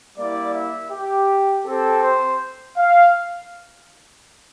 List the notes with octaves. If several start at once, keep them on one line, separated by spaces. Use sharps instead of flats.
G3 A#3 E4 D5
E5
G4
C4 G4 A4
C5
F5